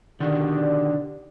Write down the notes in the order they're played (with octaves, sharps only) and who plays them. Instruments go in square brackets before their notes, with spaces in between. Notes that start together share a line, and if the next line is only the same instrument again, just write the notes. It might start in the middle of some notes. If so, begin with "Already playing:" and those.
[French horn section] B2 G4 D5 [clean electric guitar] D3 D#3